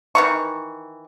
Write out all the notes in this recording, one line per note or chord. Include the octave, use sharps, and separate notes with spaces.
D#3 E3 C#6